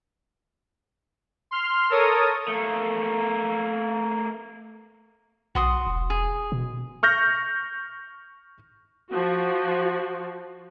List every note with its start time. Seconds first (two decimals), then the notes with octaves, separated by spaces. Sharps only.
1.51 C6 F6
1.90 A4 A#4 C#5 D#6
2.48 A3 A#3
5.55 B1 F#4 C6 D#6
5.87 E1
6.10 G#4
6.52 B2
7.03 C#6 F6 G6 A#6
9.10 F3 F#4